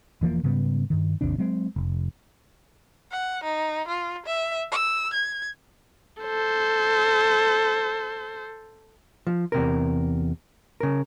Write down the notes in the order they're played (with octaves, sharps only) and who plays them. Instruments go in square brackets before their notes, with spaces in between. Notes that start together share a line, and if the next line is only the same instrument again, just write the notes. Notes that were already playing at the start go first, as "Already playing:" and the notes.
[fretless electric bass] E1 E3 F3 A#3
G#2 C#3 G3 B3
G2 D#3
G#1 D#2 C3 D4
F#3 G#3 C4
F1
[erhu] F#5
D#4
F4
E5
E6
G#6
[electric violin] A4 C5
[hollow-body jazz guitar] F3
E2 C3 A#4
C#3 A#4